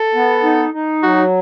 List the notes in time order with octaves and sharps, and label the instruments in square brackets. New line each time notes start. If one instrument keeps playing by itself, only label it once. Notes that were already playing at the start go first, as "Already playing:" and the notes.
Already playing: [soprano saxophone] A4
[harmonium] B3
D#4
D#4
[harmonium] F#3 [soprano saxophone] F#4